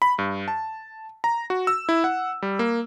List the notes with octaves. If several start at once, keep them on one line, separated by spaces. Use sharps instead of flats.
B5
G2
A5
A#5
F#4
E6
E4
F#5
G3
A#3